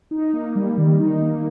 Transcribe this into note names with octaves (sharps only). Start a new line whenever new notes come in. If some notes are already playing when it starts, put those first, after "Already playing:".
D#4
A#3
G3
D#3
D#4
A#3